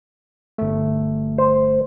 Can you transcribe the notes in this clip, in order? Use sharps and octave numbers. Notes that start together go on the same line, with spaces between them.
G1 A3
C5